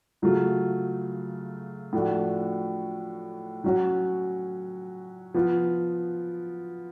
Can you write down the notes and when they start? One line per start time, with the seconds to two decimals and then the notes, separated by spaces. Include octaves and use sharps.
0.22 C#3 F#3 A3 F4
1.93 A2 F3 A3 D4 F#4
3.64 F#3 C#4 F#4
5.34 F3 B3 F4